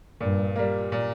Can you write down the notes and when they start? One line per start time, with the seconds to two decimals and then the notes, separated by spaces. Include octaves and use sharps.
0.21 G2 A#2
0.56 G3 A#3
0.92 A#2